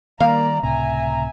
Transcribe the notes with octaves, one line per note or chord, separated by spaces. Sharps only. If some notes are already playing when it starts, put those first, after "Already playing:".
D#3 G3 A#3 D5 F5 A#5
C#2 A2 C3 E5 G#5 A#5